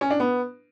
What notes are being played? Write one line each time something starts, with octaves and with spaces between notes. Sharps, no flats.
C#4
D4
B3